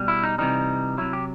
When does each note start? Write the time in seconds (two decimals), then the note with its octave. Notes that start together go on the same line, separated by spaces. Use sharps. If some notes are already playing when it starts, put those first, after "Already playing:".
Already playing: B2 G3
0.08 E4
0.23 D#4
0.38 C3 E3 G3 D#4
0.98 C3 F#3 E4
1.13 G4